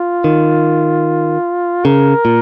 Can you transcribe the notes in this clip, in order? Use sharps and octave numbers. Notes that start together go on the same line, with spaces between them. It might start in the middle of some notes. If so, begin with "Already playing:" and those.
Already playing: F4
D#3
C#3 A#4
A#2